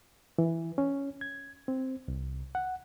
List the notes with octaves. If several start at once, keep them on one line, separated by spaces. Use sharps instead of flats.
E3
C#4
G#6
C4
C2
F#5